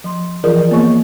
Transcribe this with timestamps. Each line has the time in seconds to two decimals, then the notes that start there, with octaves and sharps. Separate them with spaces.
0.04 F3 C6
0.44 E3 F3 F4 G#4 A#4 D5
0.71 A#3 B3 G#4 C#5 D#5 C#6